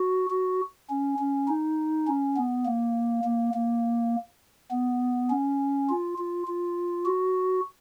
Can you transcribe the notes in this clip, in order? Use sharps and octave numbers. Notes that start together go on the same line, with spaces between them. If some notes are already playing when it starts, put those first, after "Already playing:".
Already playing: F#4
F#4
C#4
C#4
D#4
C#4
B3
A#3
A#3
A#3
B3
C#4
F4
F4
F4
F#4